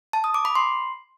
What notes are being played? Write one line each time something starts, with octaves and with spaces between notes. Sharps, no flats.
A5
D#6
D6
B5
C6